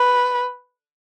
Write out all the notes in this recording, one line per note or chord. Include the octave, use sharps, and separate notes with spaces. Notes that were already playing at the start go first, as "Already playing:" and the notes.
Already playing: B4